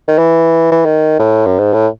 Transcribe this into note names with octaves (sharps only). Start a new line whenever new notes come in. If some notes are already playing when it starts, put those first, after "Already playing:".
D#3
E3
E3
D#3
A2
F#2
G#2
A2